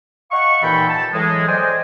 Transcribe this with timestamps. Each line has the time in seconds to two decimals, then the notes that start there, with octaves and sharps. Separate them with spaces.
0.31 D#5 F5 F#5 C#6
0.62 D#2 A#2 E3 A4 G5 B5
0.89 A5
1.12 A2 E3 F#3 G#3
1.46 C5 D5 D#5 G5 G#5